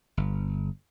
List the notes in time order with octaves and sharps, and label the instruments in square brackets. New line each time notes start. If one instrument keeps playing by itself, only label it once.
[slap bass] G1